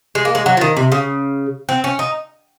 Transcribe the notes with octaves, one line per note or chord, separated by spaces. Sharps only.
G#3
A#3
G#3
F#3
F3
D#3
C3
C#3
C4
C#4
D#4